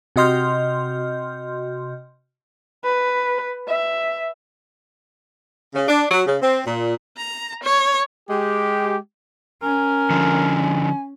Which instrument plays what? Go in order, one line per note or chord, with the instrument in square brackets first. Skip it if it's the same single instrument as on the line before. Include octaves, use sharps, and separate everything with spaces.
[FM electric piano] C3 F#4 D#5 C6 F6 G6
[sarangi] B4
E5
[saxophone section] C#3
D4
F#3
C#3
C4
A#2
[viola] A#5
C#5
[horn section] G#3 G4
[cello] C#4 [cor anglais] A#4 [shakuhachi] G#5
[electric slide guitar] D3 F3